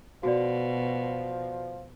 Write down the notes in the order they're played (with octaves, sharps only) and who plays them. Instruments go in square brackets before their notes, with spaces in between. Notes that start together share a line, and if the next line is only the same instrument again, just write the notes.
[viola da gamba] B2 [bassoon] F3 [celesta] F#4 D5